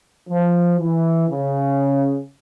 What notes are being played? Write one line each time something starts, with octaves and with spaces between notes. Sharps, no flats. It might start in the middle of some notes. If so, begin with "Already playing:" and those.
F3
E3
C#3